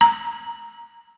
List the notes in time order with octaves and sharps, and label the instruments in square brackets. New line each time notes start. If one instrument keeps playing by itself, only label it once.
[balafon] A#5